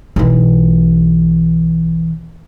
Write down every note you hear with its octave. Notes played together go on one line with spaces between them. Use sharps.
B1 E3